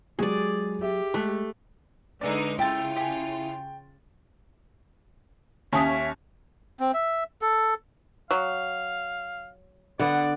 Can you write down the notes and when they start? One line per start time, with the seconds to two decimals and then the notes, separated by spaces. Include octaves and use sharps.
0.19 F#3 G#3 G4 G#4 D5
0.81 G4 E5
1.14 G#3 A3 F#6 B6
2.21 D3 E3 G#3 D#4 B4 D5
2.59 C#3 G3 A3 E4 F4 G5 A6
2.96 G4 G#5
5.73 D#2 C#4 E5 G#5 A5 D#6
6.80 C4
6.94 E5
7.42 A4
8.31 F#3 F5
9.99 D3 B3 D5 F#5